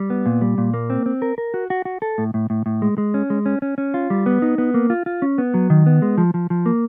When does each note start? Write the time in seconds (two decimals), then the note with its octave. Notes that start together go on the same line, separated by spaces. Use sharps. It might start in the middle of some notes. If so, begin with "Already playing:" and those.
Already playing: G3
0.10 B3
0.26 A#2
0.41 G3
0.58 A#2
0.74 A#3
0.90 C4
1.06 C4
1.22 A#4
1.38 A#4
1.54 F#4
1.70 F#4
1.85 F#4
2.02 A4
2.18 A2
2.34 A2
2.50 A2
2.66 A2
2.82 G#3
2.98 G#3
3.14 C#4
3.30 G#3
3.46 C#4
3.62 C#4
3.78 C#4
3.94 F4
4.10 G3
4.26 B3
4.42 D#4
4.58 B3
4.74 A#3
4.90 F4
5.06 F4
5.22 C#4
5.38 B3
5.54 F#3
5.70 D#3
5.86 B3
6.02 G#3
6.18 F3
6.34 F3
6.50 F3
6.66 A#3